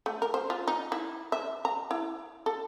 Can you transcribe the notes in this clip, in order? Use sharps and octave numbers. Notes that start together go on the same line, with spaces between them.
A3
A#4
C5
F4
D#4
E4
E5
A#5
E4
A4